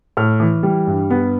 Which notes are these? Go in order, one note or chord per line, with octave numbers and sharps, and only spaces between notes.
A2 F6
E3
G3
G2
B3